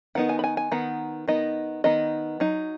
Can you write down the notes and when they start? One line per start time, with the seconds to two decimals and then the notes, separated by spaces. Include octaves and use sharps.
0.15 D#3 B3 D#4 F#5
0.29 G#5
0.39 B5
0.44 G#5
0.57 G#5
0.71 D#3 B3 D#4 F#5
1.28 D#3 B3 D#4 D#5
1.84 D#3 B3 D#4 D#5
2.40 F#3 D#4